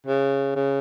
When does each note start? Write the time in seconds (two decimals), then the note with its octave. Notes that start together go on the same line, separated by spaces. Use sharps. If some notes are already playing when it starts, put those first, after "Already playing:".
0.06 C#3
0.55 C#3